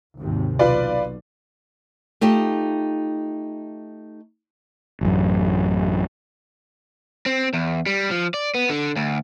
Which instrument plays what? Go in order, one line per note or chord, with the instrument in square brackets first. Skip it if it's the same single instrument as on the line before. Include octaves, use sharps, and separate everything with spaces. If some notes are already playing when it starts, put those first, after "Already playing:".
[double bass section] G#1 D#2 C3
[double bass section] B1 [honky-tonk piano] F4 B4 D5
[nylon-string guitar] A3 D#4 F4 G4
[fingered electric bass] A1 F#2
[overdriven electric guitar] C4
E2
G3
F3
D5
B3
D3
D2